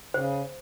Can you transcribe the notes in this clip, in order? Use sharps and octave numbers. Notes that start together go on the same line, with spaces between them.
C#3 C5